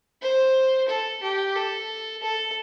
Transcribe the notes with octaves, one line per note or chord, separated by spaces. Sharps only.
C5
A4
G4
A4
A4